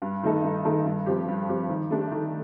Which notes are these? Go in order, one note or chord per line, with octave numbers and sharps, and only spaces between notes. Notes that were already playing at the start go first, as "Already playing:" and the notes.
G2
D#3 A3 D#4 A4
G2
D#3 A3 D#4 A4
G2
F3 C4 G4
G2
F3 C4 G4
D#3
A3 D4 G4
D#3